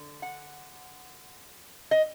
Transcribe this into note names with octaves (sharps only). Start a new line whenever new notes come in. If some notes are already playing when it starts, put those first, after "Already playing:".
Already playing: D3
F#5
D#5